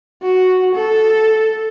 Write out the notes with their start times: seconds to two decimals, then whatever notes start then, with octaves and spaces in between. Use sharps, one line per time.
0.23 F#4
0.75 A4